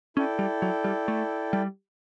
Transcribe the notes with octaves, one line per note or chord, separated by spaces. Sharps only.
C#4 E4 A4 D5 G5
G3
F#3
G3
A3
G3